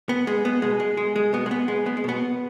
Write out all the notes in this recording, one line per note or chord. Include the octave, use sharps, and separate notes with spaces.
B3
G#3
B3
B2 G#3
G#3
G#3
G#3
B2 B3
G#3
B3
G#3
B3
G#3
B2 B3